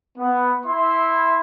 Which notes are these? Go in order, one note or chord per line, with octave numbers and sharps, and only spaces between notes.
B3
E4 E5 C6